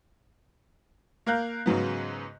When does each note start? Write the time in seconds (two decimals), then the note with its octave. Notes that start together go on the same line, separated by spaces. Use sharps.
1.26 A#3 A#4 F5 F#6 G6
1.66 G#2 C#3 F#3 B3